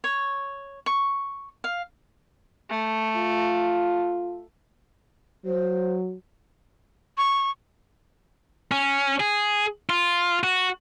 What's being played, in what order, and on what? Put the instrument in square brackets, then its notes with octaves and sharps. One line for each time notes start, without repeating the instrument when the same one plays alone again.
[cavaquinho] C#5
C#6
F5
[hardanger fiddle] A3
[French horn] F4
[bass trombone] F#3 [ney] C5
[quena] C#6
[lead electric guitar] C#4
G#4
F4
F#4